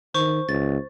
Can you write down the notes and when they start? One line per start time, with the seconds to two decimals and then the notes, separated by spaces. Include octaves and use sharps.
0.14 D#3 C5 C#6
0.49 C#2 A6